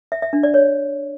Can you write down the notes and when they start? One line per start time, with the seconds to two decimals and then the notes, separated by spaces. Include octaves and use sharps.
0.12 E5
0.22 E5
0.33 D4
0.43 D5
0.54 C#5